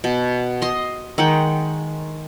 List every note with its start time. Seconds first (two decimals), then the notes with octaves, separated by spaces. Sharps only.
0.04 B2
0.62 D#5 C6
1.18 D#3 G#3 F#5 G5